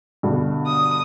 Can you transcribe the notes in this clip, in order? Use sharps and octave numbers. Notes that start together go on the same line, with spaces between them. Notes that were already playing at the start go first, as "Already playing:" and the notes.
G2 B2 D3
D#6